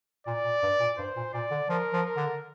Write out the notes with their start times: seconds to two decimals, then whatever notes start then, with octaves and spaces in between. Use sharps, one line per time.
0.27 A#2 D5
0.45 A#2
0.63 G2
0.80 A#2
0.98 G2 C5
1.16 A#2
1.33 A#2 D5
1.51 D3
1.69 F3 A#4
1.93 F3
2.05 A#4
2.17 D3